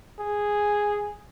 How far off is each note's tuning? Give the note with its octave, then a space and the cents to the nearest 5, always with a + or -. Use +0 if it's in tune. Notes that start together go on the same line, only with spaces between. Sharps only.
G#4 -5